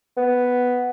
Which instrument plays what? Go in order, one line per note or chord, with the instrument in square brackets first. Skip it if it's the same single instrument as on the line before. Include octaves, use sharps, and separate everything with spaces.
[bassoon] B3